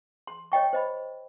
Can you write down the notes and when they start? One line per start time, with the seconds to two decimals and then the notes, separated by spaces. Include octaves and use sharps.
0.27 C6
0.52 C#5 D#5 G5 C#6
0.73 C5 D#5 B5